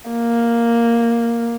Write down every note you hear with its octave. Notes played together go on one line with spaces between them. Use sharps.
A#3